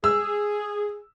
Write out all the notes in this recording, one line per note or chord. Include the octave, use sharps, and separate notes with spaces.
G#4 E6